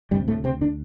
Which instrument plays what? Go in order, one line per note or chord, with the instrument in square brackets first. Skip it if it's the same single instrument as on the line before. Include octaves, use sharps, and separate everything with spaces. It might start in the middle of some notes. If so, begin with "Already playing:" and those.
[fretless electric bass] D2 G2 C3 G3
A2 A3
C3 C4
D3 D4